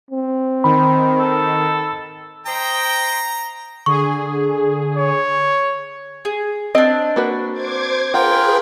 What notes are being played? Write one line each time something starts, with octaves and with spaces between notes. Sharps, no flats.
C4
D#3 B5
A4
C5 D#5 G5 A#5
D3 G#4 C#6
C#5
G#4
C4 D4 D#5
A#3 F#4 B4
C5 D6 G#6
F4 G#4 A#4 B4 F#5 G5